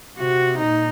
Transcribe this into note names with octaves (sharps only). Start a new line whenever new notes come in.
C3 F#4
A#2 D#4